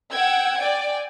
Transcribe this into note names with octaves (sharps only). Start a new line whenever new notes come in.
F#5 G5 E6 G#6
D5 G5 G#5